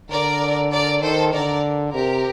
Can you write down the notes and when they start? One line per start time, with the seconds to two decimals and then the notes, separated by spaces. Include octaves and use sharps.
0.10 D3 A#4 D5
0.72 A#4 D5
1.02 D#3 A4 C5
1.33 D3 A#4 D5
1.94 C3 G4 A#4